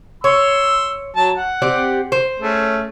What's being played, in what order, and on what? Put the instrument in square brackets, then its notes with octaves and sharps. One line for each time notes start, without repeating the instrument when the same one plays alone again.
[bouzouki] C#5 [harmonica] C6 E6
[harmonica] F#3 A5
F#5
[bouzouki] C4 G4 D5
C5
[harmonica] A3 C#4 G#4